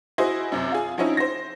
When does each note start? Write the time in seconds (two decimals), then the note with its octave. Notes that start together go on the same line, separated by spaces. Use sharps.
0.18 E4 F#4 G#4 C5 D#5
0.52 F#2 C3
0.72 F4 G#4
0.98 F3 C4 C#4 D#4 E4
1.17 C5 A#6